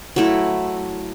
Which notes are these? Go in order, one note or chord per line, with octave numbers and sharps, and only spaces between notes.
F#3 A3 E4